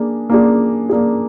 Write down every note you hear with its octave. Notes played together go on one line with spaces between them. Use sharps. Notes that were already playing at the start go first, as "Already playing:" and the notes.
Already playing: A#3 D4 G#4
A#3 D4 G#4
A#3 D4 G#4